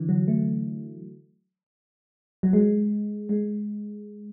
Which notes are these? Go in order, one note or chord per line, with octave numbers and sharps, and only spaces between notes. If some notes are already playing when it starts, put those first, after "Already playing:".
Already playing: D3 E3
F#3
A3
F#3
G#3
G#3